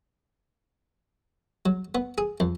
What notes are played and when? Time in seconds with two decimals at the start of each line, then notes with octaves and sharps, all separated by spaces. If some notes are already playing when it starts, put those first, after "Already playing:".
1.66 F#3
1.95 B3
2.18 G#4
2.40 F2